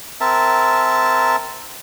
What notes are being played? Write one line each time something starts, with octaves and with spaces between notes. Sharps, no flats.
C4 A#4 E5 A5